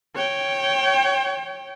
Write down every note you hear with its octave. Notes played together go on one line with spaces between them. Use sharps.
C#5 G5